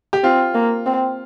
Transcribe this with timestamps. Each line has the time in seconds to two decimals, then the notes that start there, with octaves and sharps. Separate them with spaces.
0.13 G4
0.23 C4 F4
0.54 A#3
0.86 C4